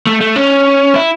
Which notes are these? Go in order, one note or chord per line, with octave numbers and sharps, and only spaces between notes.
A3
A3
C#4
E4